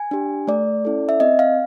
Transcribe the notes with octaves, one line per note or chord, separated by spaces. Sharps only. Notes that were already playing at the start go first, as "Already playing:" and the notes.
Already playing: G#5
D4 G4
A3 D5
C#4 E4 A4
E5
C4 D#5
F5